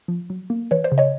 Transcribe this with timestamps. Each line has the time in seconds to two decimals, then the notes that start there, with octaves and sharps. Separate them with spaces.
0.08 F3
0.30 F#3
0.50 A#3
0.71 E3 B4 C#5
0.84 C5 D5
0.92 C#3
0.98 C#5 D#5